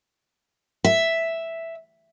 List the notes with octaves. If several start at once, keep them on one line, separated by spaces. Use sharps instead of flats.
E5